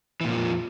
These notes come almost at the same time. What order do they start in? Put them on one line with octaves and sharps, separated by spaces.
E3 A#2 D3 F3 F2